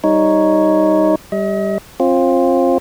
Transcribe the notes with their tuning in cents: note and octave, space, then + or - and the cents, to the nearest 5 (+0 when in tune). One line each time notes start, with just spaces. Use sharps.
G3 +0 D#4 +5 C#5 +0
G3 +0 D#5 +40
C4 +30 F4 +5